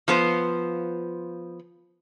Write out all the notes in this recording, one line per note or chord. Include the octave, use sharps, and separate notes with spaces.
F3 B3 C5